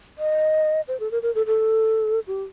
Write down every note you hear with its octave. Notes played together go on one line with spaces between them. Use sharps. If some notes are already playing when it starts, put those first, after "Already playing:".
D#5
C5
A4
A#4
A#4
A4
A4
G4